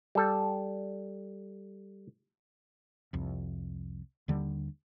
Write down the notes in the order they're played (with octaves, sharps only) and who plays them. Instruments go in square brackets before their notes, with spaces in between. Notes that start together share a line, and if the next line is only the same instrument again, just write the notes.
[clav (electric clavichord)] G3 A4
[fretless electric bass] C2 F2
D#2 D3 G3